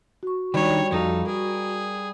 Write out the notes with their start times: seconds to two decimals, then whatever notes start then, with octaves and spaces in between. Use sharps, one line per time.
0.23 F#4 C#6
0.54 D#3 F#3 G3 D4 C#5
0.92 F2 D#4 A4 F5
1.27 G#4 A#4